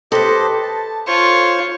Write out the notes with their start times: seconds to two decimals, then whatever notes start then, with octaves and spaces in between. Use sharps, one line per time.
0.12 G4 A4 B4 C5 D#5
0.63 A5
1.07 F4 C5 C#5 C6 C#6